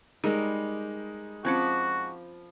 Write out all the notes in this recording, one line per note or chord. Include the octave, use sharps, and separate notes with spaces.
G3 G#3 D#4 G#4 A#4
F3 C4 C#4 F4 F#4 B5 D6